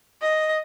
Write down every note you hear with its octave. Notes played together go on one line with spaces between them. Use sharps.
D#5